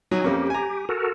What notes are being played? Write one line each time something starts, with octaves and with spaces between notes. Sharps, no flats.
F#3 D#4 G#5
F2 A#3 C#4 G4
G#5 A#5
F#4 A4 A#4